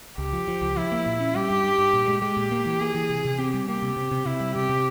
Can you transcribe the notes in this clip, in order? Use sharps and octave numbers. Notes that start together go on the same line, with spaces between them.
C#2 G4
F3
F3
C#2
F3 E4
A#3
A#2
C#4
G3 G4
G2
G2
G2
A#2
G#3
G#3 G4
A#2
A#3
E3
A#3 G#4
E3
C3
C3
C4 G4
G3
A#3 G4
C3
C3
C3
C3 E4
G3
C3 G4
C3